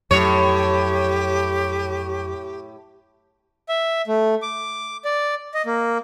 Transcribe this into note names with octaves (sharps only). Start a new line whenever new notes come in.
F2 A2 F#3 G4 C#5
E5
A3
D6
D5
D#5
A#3